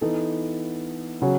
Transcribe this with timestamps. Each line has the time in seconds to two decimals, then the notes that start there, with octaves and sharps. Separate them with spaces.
0.01 E3 B3 D#4 A4
1.22 C#3 F#3 C#4 F#4